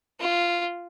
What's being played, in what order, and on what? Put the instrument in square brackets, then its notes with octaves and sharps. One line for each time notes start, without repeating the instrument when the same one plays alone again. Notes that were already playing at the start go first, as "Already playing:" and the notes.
[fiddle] F4